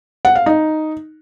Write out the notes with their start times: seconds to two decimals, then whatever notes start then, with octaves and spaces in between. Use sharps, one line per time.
0.25 F#5
0.35 F5
0.46 D#4